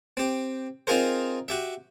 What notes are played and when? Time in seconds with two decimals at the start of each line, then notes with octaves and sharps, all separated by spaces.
0.17 C4 G4
0.87 C4 D#4 F4 G#4 A#4 C5
1.48 F#4 G4 E5